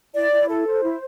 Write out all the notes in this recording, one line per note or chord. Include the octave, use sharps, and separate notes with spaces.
E4 D5
E4
A4
C5
E4